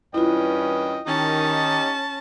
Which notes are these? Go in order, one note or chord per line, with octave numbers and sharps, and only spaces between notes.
G2 C#4 E4 F4 B4 D#5 G5
D#3 C#4 D#4 G4 D#5 A5